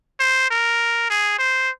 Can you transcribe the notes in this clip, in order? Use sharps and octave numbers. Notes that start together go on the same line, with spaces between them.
C5
A#4
G#4
C5